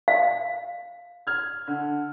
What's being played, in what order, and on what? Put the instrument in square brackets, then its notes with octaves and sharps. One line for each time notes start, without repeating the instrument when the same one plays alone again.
[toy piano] F5
[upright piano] F6 G#6
D3